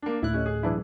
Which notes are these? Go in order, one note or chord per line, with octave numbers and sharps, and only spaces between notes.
A#3 D4
D2 A2 A3 E4 F#6
C#4 G4 A4 D#5
G#4
F#2 B2 E3 F#3 D4 E4